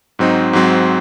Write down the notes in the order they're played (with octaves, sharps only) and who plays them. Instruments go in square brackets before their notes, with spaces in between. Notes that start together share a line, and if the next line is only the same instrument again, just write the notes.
[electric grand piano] G#2 F#3 C4 D#4
G#2 F#3 C4